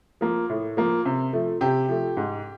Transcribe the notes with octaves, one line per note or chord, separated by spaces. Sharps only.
F3 A#3
A2
F3 A#3
C3
F3 A3
C3 G4
F3 A3
G#2